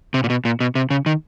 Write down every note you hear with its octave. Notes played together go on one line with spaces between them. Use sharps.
C3
A#2
B2
A#2
B2
C3
C#3
D#3